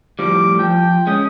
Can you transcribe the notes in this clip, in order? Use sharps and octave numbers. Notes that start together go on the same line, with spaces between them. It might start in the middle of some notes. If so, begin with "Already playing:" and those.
A2 F3 G3 D6
F3 G5
G#3 C#4 D#6